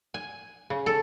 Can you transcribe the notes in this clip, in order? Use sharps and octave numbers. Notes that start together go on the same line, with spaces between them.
G#5
C#3
A4